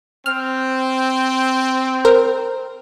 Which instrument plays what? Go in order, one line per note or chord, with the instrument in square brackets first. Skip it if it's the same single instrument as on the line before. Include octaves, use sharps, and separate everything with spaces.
[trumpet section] C4 [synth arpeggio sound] F6
[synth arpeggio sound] A#4 C5